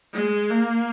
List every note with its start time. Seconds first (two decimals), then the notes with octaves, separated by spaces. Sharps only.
0.14 G#3
0.50 A#3